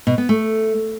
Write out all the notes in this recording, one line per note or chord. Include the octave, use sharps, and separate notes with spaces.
B2
B3
A3